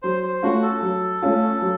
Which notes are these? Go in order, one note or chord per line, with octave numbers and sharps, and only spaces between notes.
F#3 C5
C5
A3 C#4 F4 F#4
A4
F#3
A3 C#4 F4
F#3